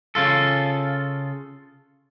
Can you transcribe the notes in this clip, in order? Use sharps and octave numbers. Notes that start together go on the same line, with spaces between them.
C#3 F4 A4